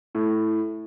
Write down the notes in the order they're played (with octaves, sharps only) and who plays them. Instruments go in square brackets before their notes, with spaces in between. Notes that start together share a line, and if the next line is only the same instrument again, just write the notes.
[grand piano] A2